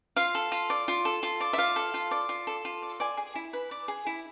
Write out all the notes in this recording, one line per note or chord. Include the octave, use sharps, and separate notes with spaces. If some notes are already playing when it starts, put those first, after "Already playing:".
F4 F5
A4
F4
D5
F4
A4
F4
D5
E5
F4 F5
A4
F4
D5
F4
A4
F4
D5
D5 G#5
G#4
E4
B4
D5
G#4
E4